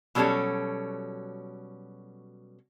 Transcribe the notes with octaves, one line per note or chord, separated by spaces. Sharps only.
B2 F#3 G3 C#4 A4 C#5